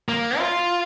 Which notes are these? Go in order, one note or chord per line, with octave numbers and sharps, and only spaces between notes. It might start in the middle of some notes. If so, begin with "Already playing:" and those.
A#3
F4